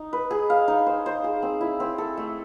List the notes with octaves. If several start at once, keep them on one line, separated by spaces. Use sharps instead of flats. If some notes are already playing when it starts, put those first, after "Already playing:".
Already playing: D#4
B4
G#4
F5
D#4
C5
C5
G#4
C4
E4
C4
A4
A3